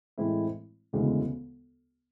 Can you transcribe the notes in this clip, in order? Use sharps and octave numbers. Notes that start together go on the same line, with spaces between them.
A2 E3 G#3 C4 E4
E1 D2 C#3 E3 G#3